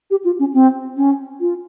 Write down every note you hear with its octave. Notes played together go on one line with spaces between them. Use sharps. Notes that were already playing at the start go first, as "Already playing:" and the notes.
G4
F4
C#4
C4
C#4
F4